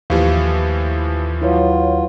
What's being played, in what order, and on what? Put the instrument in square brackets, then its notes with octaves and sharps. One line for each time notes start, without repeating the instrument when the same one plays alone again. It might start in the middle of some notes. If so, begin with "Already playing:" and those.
[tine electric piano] D#2 [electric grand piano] A2 E3 F3 [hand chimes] G4 F5
[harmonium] F#3 F4 [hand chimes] E4 B4 C#5